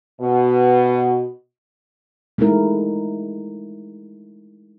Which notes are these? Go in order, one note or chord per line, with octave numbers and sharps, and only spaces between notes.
B2
G#3 A3 D#4 E4 A#4